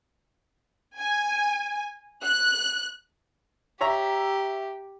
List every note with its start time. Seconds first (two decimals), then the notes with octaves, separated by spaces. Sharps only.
0.97 G#5
2.23 F#6
3.81 G4 C#5 E5 A#5